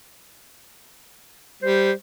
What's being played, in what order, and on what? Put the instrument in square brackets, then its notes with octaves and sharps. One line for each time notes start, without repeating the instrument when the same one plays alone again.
[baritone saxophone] G3 [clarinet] C5